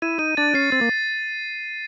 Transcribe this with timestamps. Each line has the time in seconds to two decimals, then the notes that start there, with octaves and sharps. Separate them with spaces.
0.02 E4 D#7
0.19 D#4 D#7
0.37 D4 A6
0.54 C#4 C7
0.72 C4 A6
0.81 A#3